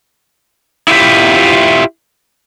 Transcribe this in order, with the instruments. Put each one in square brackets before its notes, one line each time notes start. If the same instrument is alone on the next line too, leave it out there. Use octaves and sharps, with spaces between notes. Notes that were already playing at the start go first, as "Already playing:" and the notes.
[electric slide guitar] E4 F4 G4 E5